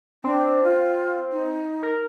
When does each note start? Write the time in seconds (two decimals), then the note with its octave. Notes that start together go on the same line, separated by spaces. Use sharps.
0.24 C4 D4
0.64 F4
1.32 D#4
1.83 A#4